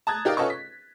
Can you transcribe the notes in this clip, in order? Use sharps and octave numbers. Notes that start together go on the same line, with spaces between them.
A5 A#5 D#6 F#6 G#6 A6
D#4 G4 A#4 D5 D#5 F5
C#4 F4 A4 B4 D#5 C#6
B6